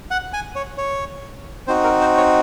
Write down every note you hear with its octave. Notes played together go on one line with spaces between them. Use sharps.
F#5
G#5
C#5
C#5
C4 D#4 F#4 C5
A#4
C5
C#5